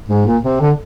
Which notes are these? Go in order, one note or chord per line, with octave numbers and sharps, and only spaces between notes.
G#2
A#2
C3
D3